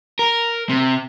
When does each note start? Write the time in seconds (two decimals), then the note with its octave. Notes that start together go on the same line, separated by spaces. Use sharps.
0.19 A#4
0.69 C3